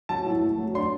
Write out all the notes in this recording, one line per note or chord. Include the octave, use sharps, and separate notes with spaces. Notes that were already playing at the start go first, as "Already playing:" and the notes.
F#3 A5
E4
A3
F#3
D4 C6